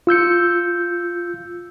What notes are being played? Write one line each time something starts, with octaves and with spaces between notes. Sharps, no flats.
F4 E6 G6 C#7